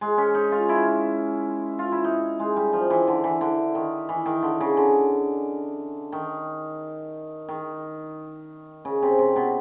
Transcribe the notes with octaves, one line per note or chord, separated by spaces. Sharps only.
G#3
C#4
D#4
F4
E4
F4
E4
D#4
G#3
G3
F3
E3
D3
E3
D3
D#3
E3
D#3
D3
C#3
D3
D#3
D#3
C#3
C3
C3
B2